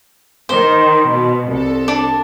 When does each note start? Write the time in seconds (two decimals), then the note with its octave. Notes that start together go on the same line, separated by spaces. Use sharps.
0.49 D#3 C5
1.09 B2
1.49 C2 A4
1.88 D4